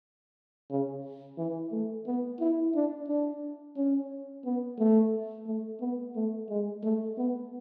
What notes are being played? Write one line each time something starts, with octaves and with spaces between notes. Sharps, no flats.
C#3
E3
A3
B3
E4
D4
D4
C#4
B3
A3
A3
B3
A3
G#3
A3
B3